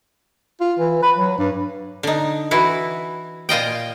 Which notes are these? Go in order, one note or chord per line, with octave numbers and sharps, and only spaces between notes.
F4
E3
B4
F#3
G2
D3 D#4
E3 E4 F#4
A#2 F4 D#5 G5